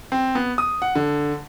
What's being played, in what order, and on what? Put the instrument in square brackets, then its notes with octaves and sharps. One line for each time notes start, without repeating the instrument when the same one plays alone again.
[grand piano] C4
B3
D#6
F#5
D3